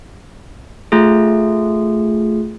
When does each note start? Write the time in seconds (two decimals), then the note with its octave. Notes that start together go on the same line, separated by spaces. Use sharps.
0.92 A3 F4 G#4